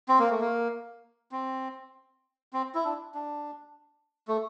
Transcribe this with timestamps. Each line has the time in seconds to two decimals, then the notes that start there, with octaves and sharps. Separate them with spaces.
0.08 C4
0.19 A#3
0.30 A3
0.41 A#3
1.32 C4
2.53 C4
2.75 E4
2.85 D4
3.14 D4
4.28 A3